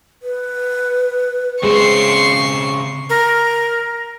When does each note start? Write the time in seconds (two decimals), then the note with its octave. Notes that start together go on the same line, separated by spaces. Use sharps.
0.23 B4
1.63 C#3 G#3 C4 C5 C#6 C7
3.10 A#4